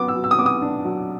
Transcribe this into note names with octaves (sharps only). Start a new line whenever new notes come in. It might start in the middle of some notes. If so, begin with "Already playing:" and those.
Already playing: F#3 B3 D6
E6
F#3
E6
D#6
B3 D6
D#6
D4
F#3